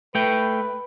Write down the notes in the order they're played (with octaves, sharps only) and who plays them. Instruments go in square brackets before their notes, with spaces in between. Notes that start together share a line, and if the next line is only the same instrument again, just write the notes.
[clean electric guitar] A3 G5 [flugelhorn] B4